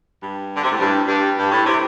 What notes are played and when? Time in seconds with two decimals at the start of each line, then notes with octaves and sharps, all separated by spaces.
0.20 G2
0.55 D3
0.64 C3
0.71 A2
0.78 G2
1.08 G2
1.37 G2
1.51 A2
1.66 C3